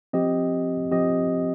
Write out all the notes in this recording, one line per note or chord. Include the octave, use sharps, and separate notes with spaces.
F3 C4 G4 D#5
F3 C4 G4 D#5